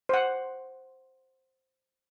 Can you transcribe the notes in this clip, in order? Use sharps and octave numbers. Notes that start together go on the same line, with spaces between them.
C5 F#5